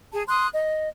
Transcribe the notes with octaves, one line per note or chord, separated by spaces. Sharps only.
G#4 A5
C6 D#6 F#6
D#5